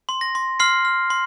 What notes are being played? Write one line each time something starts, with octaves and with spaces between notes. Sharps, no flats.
C6
A#6
C6
C6 F6 C7
F6
C6